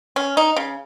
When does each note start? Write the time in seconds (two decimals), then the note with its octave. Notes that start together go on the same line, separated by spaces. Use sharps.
0.16 C#4
0.37 D#4
0.56 C#3